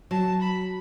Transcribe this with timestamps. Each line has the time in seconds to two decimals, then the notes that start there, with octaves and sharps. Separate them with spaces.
0.11 F#3 A5
0.41 B5